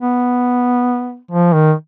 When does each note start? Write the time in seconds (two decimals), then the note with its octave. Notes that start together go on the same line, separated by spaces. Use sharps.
0.01 B3
1.31 F3
1.53 D#3